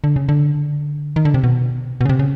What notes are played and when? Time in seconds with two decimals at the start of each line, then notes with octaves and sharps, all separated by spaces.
0.04 D3
0.16 C#3
0.29 D3
1.16 D#3
1.25 D3
1.34 C3
1.44 B2
2.01 B2
2.05 C#3
2.09 C3
2.19 C#3